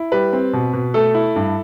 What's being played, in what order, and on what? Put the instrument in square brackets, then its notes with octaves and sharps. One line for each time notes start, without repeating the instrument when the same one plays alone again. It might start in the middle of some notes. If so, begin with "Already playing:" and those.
Already playing: [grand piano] E4
G3 B4
C4
B2
B2
A3 A4
E4
G2